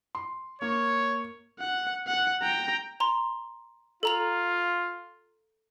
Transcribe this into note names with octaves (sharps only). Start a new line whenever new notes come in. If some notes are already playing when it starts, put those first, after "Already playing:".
C6
A#3 C#5
F#5
F#5
G5 A#5
A#5 C6
F4 A4 A#5 F7